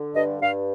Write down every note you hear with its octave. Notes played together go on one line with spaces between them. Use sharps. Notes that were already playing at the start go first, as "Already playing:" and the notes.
Already playing: D3
G2 D#5
G2 F5